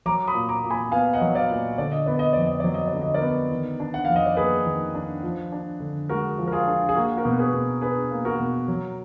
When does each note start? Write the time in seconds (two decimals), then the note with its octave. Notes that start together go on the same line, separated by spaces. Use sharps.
0.06 F#3 A#5 D6
0.27 B5 D#6
0.34 A#2
0.49 A#5 D6
0.64 A#2
0.70 G#5 B5
0.92 B3 F5 G#5
1.14 D#5 F#5
1.21 F#3
1.35 D5 F5
1.49 A#2
1.78 D3 D5
1.92 D#5
2.06 B3 D5
2.19 D#5
2.33 F2 D5
2.47 D#5
2.60 F#3 D5
2.74 D#5
2.88 D5
2.93 D3
3.01 D#5
3.14 A#4 D5
3.21 B3
3.51 D#3
3.80 D4
3.94 F#5
4.05 F2 F5
4.16 D#5
4.26 D5
4.37 A#3 G#4 B4
4.66 D#3
4.94 D4
5.23 F3
5.52 D4
5.80 D3
6.09 G#3 F#4 A#4
6.38 F3
6.48 A#4
6.52 F4 G#4
6.67 D4
6.89 G#4
6.96 A#3 F#4
7.17 F#4 A#4
7.25 B2
7.39 G#4 B4
7.53 B2
7.81 D4 G#4 B4
8.11 A#3
8.25 F#4 A#4
8.40 B2
8.68 F#3